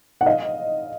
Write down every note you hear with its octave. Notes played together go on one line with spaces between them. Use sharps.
F#5
D#5 F5